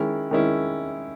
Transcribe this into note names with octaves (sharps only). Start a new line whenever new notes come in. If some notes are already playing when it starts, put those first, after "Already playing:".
Already playing: D#3 G#3 C#4 E4
D#3 G#3 C#4 E4